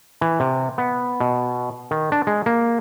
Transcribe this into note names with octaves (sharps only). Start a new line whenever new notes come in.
E3
C3
B3
B2
D#3
D4
G#3
A#3